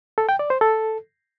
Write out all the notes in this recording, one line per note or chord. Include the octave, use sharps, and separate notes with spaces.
A4
G5
D5
C5
A4